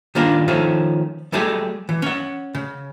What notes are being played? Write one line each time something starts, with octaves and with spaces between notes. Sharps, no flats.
D#3 G3 A#3 D4 F4
D#3 F3 A3 C#4
F#3 G3 A3 G4 G#4
E3
C#4 F#5
C#3